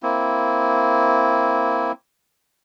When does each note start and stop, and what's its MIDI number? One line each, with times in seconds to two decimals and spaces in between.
0.03 1.92 58
0.03 1.92 60
0.03 1.92 64